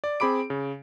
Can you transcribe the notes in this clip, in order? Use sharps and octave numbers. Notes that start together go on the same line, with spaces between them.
D5
C4 G#4 B5 D6 D7
C#3